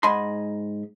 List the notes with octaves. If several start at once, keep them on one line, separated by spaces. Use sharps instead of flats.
G#2 D#5 G#5 B5 C6